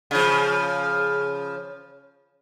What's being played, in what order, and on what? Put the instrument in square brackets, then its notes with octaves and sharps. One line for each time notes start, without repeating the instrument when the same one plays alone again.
[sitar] C#3 F3